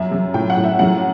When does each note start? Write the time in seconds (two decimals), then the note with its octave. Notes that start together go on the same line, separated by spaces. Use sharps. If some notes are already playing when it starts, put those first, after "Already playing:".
Already playing: F#2 E5
0.12 F#2
0.34 A2 G5
0.50 F#5
0.57 A2
0.64 E5
0.79 F#2 F#5